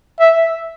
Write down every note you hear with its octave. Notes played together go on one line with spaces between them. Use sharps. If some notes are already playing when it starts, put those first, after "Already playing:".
E5